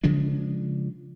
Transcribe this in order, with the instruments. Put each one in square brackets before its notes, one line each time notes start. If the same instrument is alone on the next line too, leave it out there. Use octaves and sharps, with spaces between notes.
[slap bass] C#3 F3 G#3 D4